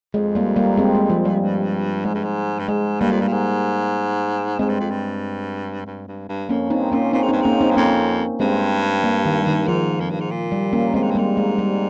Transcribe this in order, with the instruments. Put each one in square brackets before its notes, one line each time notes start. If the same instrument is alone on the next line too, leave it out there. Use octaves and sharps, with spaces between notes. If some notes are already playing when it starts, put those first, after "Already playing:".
[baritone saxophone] F2 [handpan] G#3
[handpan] G3 A#3
G3 A#3
G#3 C4
G#3
F3
G3
[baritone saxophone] G2
[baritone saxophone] G#2 [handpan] G#3
[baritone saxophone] G2
G#2
G2
[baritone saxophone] G#2 [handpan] G#3
[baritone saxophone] G2 [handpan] G3 A#3
[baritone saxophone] F2
G2
A#2
G#2
[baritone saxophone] G#2 [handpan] G#3 C4
[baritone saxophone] G2
F2
G2
G2
G2
G2
[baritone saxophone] F2 [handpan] A#3 C#4
[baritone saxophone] G2 [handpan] C4 D#4
[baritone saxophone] A#2 [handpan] A#3 C#4
[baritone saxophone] A#2 [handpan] C4 D#4
[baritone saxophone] G#2
[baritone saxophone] G2 [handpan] C4 D#4
[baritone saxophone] G#2 [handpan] A#3 C#4
[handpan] C4 D#4
[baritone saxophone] G2
[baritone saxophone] F2 [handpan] A#3 C#4
[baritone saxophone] G2 [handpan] G#3 C4
[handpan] G3 A#3
D#3
D#3
[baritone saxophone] G#2 [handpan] F3
[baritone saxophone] F2
G2
G#2
A#2
[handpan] G3
A#3 C#4
[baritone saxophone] A#2 [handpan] G#3 C4
[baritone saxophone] G#2
G2
[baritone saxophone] G#2 [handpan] G3 A#3
[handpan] G#3
G3